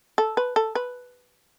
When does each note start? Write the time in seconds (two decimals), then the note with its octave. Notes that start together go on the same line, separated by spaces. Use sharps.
0.18 A4
0.37 B4
0.56 A4
0.75 B4